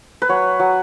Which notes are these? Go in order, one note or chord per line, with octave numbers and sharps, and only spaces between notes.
B4
F#3 C#5
F#3